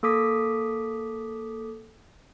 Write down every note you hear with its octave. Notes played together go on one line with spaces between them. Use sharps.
A#3 A4 D6 D#6 B6